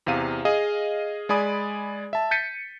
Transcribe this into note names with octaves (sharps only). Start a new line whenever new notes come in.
E2 C3 F5 D#7
G#4 D#5 F5
G#3 G#4 D5 G#5 B5 D#6
E5 A5
G6 A6 B6 C#7 D#7